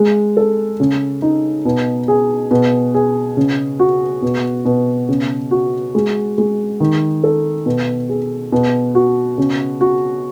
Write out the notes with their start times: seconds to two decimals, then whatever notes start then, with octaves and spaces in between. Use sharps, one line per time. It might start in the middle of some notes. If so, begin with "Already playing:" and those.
Already playing: G#3
0.37 A4
0.80 C#3
1.22 D#4
1.65 B2
2.08 G#4
2.51 B2
2.94 G#4
3.37 C#3
3.79 F#4
4.22 B2
4.65 B2
5.09 C#3
5.51 F#4
5.95 G#3
6.38 G#3
6.80 D#3
7.24 A4
7.66 B2
8.09 G#4
8.52 B2
8.95 F#4
9.38 C#3
9.81 F#4